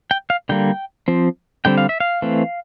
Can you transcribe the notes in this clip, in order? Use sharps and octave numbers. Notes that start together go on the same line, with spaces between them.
G5
F5
D3 G3 A#3 G5
F3 C4
D3 G3 C4 G5
F5
E5
F5
E3 A3 C4